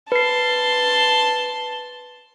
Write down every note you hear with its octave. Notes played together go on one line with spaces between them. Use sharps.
B4 A5 C6 C7